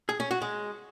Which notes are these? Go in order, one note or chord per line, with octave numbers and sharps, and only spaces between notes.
G#4
C#4
F#4
G#3